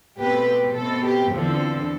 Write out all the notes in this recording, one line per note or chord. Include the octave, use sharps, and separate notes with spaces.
B2 A3 C4 G4 B4
G4
B2 A3 C4 A4
G4
E2 D3 F3 C4 A4